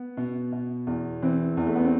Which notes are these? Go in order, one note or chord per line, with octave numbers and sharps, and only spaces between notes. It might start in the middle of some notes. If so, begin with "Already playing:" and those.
Already playing: B3
B2
B2
E2
E3 C4
E2
A3
B3
C4